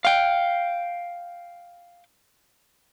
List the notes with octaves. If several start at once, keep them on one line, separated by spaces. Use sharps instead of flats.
F5 G5